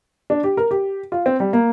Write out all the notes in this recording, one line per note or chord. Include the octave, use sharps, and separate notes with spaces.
D4
G4
A#4
G4
F4
C4
G3
A#3